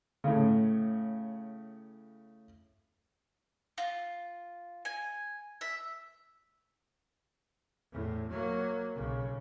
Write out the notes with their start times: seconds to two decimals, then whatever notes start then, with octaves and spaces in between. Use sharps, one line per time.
0.24 A2 C#3
3.78 F4
4.85 G#5
5.61 E5
7.92 E2 A2
8.28 F#3 A#3
8.94 B1 C#3